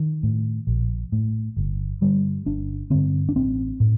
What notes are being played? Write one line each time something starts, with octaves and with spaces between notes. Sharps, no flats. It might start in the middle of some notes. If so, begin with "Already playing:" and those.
Already playing: D#3
A2
A#1
A2
G1
G2 D3 G3
G1 D4
G2 D3 C4
D4
A1 C4
A2